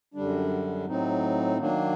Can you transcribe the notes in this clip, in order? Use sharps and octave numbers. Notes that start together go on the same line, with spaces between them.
F#2 D3 G3 D4
A2 F#3 C4 D#4
D#3 F#3 A#3 D4